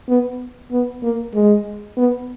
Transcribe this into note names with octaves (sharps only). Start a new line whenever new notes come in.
B3
B3
A#3
G#3
B3